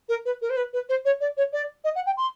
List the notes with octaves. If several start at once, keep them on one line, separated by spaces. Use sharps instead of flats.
A#4
B4
A#4
C5
B4
B4
C5
C#5
D5
C#5
D5
D#5
F#5
G5
C6